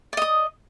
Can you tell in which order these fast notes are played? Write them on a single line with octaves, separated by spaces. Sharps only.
D5 D#5 D#6